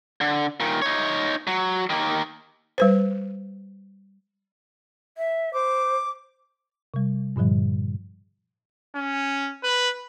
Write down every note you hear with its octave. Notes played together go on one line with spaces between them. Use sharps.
D3
A#2 D#3
D#4 C#5
F#3
D#3 A#3
G3 B4 C5
E5
C5 D6
C3 G3
G2 A#2 D3 F3 G3
C#4
B4